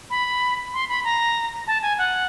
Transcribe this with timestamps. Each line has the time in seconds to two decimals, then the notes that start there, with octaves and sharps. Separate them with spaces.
0.10 B5
0.74 C6
0.89 B5
1.04 A#5
1.67 A5
1.83 G#5
1.98 F#5